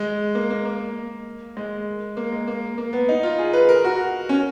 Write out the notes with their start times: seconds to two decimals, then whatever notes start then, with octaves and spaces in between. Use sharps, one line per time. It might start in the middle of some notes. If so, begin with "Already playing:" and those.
Already playing: G#3
0.35 A#3
0.50 A#3
0.65 A#3
1.57 G#3
2.17 A#3
2.32 G#3
2.47 A#3
2.78 A#3
2.93 B3
3.09 D#4
3.23 F4
3.39 G#4
3.53 B4
3.69 A#4
3.84 F#4
4.29 C#4